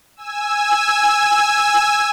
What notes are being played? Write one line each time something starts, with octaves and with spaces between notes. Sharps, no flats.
G#5 E6